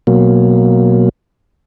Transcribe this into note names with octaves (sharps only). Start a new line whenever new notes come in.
B2 F#3 A#3